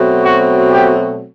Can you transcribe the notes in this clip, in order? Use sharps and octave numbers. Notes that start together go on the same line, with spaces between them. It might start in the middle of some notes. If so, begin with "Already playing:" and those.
Already playing: B2 F#3 A3 C4
F#4
G4